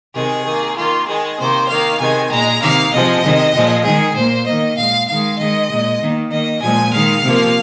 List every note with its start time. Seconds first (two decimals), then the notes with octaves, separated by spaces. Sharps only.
0.15 C3 D#3 G#3 G#4
0.45 D#3
0.50 A#3
0.76 D#3 A#3 F4
1.07 D#3 G#3 G#4
1.38 C3 D#3 A#3 C5
1.69 D#3 A#3 F5
2.00 C3 D#3 G#3 G#5
2.31 A#2 G#3 A#5
2.61 C3 D#3 A#3 F5
2.92 C3 F3 G#3 D#5
3.23 C3 D#3 G#3
3.54 A#2 F3 G#3
3.84 D#3 G#3 G#4
4.15 A#2 A#3 C5
4.46 D#3 A#3 D#5
4.77 A#2 G#3 F5
5.08 D#3 G#3 F5
5.38 D#3 G#3 D#5
5.70 A#2 G#3
6.00 D#3 A#3
6.31 D#3 A#3 D#5
6.62 A#2 F3 G#3 G#5
6.92 D#3 G#3 F5
7.23 C3 F3 A#3